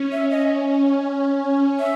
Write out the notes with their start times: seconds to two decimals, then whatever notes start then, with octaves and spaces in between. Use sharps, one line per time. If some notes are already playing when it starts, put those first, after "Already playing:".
Already playing: C#4
0.12 E5
0.31 D#5
0.68 C#4
1.79 E5